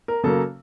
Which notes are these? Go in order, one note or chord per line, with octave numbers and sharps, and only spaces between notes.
A#4
C#3 F#3 A#3 A4